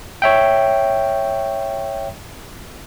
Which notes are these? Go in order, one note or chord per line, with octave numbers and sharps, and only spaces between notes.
C#5 E5 G5